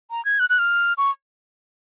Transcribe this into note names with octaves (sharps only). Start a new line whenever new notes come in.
A#5
G#6
F#6
F#6
F6
C#6